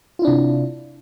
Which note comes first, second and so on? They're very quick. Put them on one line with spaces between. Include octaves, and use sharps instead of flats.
F4 E4 D4 C3